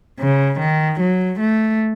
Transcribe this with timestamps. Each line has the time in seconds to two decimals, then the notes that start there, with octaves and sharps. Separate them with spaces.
0.20 C#3
0.59 D#3
1.00 F#3
1.40 A3